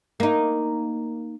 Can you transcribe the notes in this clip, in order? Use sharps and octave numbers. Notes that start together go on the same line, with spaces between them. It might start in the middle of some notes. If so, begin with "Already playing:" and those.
A#3 D#4